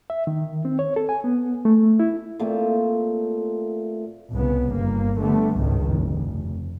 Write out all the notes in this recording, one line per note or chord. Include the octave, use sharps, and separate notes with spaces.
E5
D#3
C4
C#5
A4
G#5
B3
A3
E4
A#2 A3 C4
C2 C#3 B3
G1 A#3
D3 G3 A3 B3
G#1 C#2 G2 D#3
F1